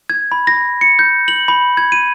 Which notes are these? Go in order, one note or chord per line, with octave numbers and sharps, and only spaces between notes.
G#6
B5
A#6
C#7
G6
F#7
B5
G#6
D#7